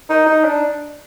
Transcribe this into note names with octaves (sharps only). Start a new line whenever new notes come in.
D#4
D#4
D4